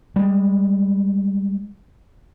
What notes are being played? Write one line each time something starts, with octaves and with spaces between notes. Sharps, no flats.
G3 G#3